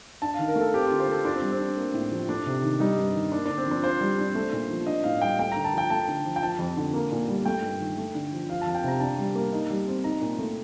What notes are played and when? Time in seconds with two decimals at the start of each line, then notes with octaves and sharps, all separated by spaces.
0.22 D4 A5
0.34 F5
0.39 D#3
0.48 A#4
0.56 A3 A4
0.74 C4 G4
0.86 F4
0.91 D3
1.00 C5
1.08 A3 A4
1.25 D4 F4
1.34 C4
1.42 G3
1.52 C4
1.60 D4
1.77 A#3
1.94 A2
2.11 F3
2.29 A3 D4
2.46 C3
2.63 D#3
2.80 G3 D#4
2.97 G2
3.15 D#3
3.32 A#3 D4
3.45 D3 D4
3.58 C4
3.67 F3 D4
3.84 F4 C5
4.01 G3
4.19 D4
4.35 A3
4.53 A#2
4.70 F3
4.87 D4 D#5
5.04 A2 F5
5.22 G3 G5
5.39 A3 G5
5.52 A#5
5.56 D3
5.64 A5
5.73 F3 G5
5.90 A3 A5
6.08 D3
6.25 F3
6.36 G5
6.42 F3 A5
6.59 F2
6.77 D3
6.93 A#3
7.12 A#2
7.28 G3
7.46 A3 G5
7.63 G2
7.80 D#3
7.98 A3
8.15 D3
8.32 F3
8.49 F3 F5
8.61 A5
8.67 F2
8.75 G5
8.84 C3 A#5
9.00 D4 A5
9.19 G3
9.35 A#3
9.53 D#4
9.70 G3
9.87 C4
10.04 D#4 A#5
10.21 A#2
10.39 A3